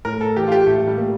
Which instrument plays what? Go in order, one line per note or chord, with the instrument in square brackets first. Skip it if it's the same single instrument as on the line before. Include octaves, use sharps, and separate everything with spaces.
[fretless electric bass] A2 [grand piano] A#4
[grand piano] A4
[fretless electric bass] E3 [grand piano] G4
[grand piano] F4
G4
[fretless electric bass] A2 [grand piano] A3
[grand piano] G3
[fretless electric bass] A#3